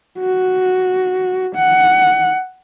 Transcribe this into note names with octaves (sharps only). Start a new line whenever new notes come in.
F#4
F#5